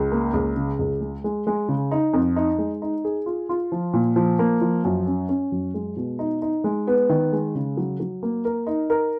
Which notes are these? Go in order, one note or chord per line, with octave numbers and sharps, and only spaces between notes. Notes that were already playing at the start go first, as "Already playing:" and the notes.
Already playing: C#2
A#3
C#2
C#3
C#2
G#3
G#3
G#3
C#3
D#4
F2
D#4
G#3
D#4
G#4
F4
F4
F3
A#2
F3
A#3
F3
F#2
C#4
C#4
F#2
G#3
B2
D#4
D#4
G#3
B3
D#3
G#3
C#3
F#3
F#3
A#3
A#4
D#4
A#4